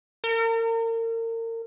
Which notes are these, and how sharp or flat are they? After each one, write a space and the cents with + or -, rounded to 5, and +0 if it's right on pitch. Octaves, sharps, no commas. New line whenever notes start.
A#4 -35